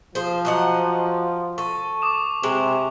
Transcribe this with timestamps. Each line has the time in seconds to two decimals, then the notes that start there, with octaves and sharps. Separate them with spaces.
0.15 F3 G#4 C5
0.45 F#3 D#5 F#5
1.58 A4 C#6
2.02 D6 D#6 E7
2.43 C3 G#3